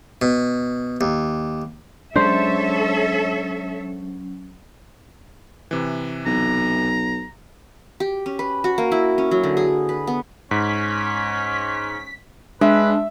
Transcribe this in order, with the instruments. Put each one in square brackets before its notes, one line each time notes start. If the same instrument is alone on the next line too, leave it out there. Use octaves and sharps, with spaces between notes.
[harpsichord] B2
D#2
[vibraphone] F#3 C#4 [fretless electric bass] G#3 D4 [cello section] A4 C#5 E5 [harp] C5
[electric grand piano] C3 E3
[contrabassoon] B1 [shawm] A#5
[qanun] G4
C#4
B4
F#4
A#3
E4
C#4
F#3
D3
G#4
B4
B3
[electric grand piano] G#2 [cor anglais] C#4 [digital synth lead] B6
[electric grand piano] G#3 [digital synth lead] D4 [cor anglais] B4 [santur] E5